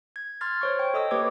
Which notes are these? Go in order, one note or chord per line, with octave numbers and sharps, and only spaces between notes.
G#6
C6 F6 G#6 A6
C5 C#5 C#6
G5
A4 D#5 D#6 E6
A#3 G4 B4 C#5 D6 G#6